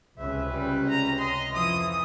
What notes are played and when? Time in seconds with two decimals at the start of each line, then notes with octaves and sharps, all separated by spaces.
0.19 C#2 C3 C#4 B4 E5
0.51 G3
0.88 A#5
1.20 D#5 C6
1.55 F2 E3 F3 D#6